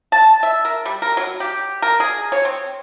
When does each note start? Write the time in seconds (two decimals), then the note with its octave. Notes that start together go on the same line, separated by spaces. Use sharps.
0.12 A5
0.43 E5
0.65 A#4
0.85 G3
1.02 A#4
1.17 F#3
1.40 G4
1.82 A#4
2.00 G#4
2.32 C#5
2.45 C4